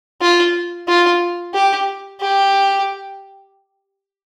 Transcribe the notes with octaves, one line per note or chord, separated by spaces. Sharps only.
F4
F4
G4
G4